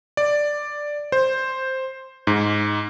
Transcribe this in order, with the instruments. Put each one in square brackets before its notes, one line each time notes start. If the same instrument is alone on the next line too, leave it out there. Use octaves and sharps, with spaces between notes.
[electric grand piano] D5
C5
G#2